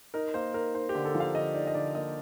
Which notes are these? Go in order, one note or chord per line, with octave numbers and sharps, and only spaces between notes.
D#4 A#4
A#3 C5
D#4 A#4
D#4 C5
G4
D3
A4
F3
F5
D3 D#5
D#4 D5
D#5
D3 D5
A#3 D#5